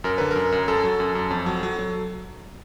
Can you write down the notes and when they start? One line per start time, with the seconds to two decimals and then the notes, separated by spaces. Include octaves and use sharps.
0.04 F#2 A#4
0.18 D3 B4
0.31 F#2 A#4
0.52 F#2
0.68 F#2 A4
0.84 F#3
1.00 F#2
1.15 F#2
1.30 F2
1.46 F#3
1.63 F#3
1.79 F#3